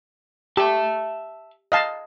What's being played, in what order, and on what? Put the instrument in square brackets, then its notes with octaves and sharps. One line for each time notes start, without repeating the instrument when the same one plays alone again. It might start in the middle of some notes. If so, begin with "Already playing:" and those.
[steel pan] G4 [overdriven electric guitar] E5 A5
[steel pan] D#5 F5 A5